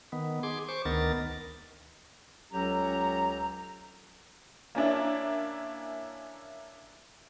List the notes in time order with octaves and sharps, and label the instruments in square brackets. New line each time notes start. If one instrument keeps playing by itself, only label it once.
[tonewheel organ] D#3 B3
G#4 C6 D6
C5 C#6 D6
D2 D#3 B3 A#4 A6
[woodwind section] C#2 F#3 C#4 G4 A4 A#5
[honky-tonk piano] A#3 C#4 D4 E4